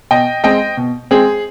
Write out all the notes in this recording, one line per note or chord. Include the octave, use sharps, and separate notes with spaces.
B2 D#5 G5
G#3 C4 D#5 G5
B2
G#3 C4 G#4